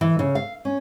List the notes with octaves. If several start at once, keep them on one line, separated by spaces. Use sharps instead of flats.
E3
C#3
F5
C#4